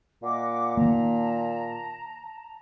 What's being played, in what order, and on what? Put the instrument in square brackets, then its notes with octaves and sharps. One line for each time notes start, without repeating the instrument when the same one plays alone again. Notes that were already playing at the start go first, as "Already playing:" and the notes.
[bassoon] A#2 [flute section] D#5 F#5 D6
[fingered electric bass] D#3 A#3 [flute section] A5 A#5